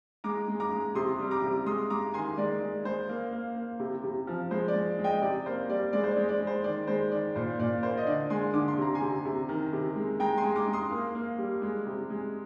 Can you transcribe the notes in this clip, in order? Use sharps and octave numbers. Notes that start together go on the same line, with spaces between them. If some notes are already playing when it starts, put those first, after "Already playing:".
G#3 A#5 D6
G#3
A#5 D6
G#3
C3 C6 D#6
G3
A#5 D6
C3
G#3 C6 D#6
G#3 A#5 D6
D#3 G#5 C6
G#3 D5
G#3
G#3 C5
A#3
A#3
A#3
C3
C3
F3
G#3 C5
D5
G#3
G#3
D#5 G5
C3 D5
A#3 C5
G3 D5
G#3 D5
C5
D5
G#3
D5
G#3
C5
D#3 D5
G#3 C5
D#3 D5
A#2 C5
A#2 D5
A#3 C5
D#5
D3 D5
G#3 G#5 C6
D3 D6
C6
C3 A#5
G#5 C6
C3
C3
D#3
C3
G#3
G#3 G5 A#5
G#5 C6
G#3
A#5 D6
G#3
C6 D#6
A#3
A#3
G3
G#3
C3
G#3